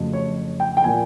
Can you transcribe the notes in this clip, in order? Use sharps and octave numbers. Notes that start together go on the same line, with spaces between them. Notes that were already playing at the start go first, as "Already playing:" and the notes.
Already playing: F2 C#3 F#3 A3
C#5
G5
G5
A#2 F3 A#3 G#5